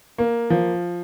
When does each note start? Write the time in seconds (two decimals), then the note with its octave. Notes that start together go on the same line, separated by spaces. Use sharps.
0.18 A#3
0.50 F3